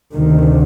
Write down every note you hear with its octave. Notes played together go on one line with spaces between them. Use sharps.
D2 C3 D#3